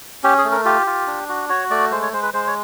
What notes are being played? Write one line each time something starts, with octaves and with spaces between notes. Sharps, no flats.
C#4 G4
G#4
A3
A#4
F4 G4
F4
D4
F#4
F#4 C#5
A3 D5
G#3 C5
C#5
G#3 C5
B4
G#3 C5
C#5